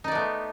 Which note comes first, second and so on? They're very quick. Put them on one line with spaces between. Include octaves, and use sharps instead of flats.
D#4 D5 B3 A3